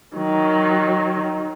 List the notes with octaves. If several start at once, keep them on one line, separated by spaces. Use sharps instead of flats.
D#3 F#3